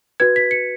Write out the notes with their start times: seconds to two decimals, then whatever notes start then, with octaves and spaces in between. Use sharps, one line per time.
0.20 F#4 B4 G#6
0.36 B6
0.51 C#7